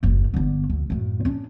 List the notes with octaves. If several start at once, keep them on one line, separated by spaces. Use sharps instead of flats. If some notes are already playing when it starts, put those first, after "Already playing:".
F#1 D#2
G1 D3
D2
F#2 A2
C#4 D4